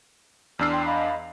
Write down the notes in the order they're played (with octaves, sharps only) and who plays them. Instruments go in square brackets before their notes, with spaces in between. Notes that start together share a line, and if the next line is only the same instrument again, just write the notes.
[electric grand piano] E2 D4 C7 [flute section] E6 F6
[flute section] G5 C6
D#5 F5 B5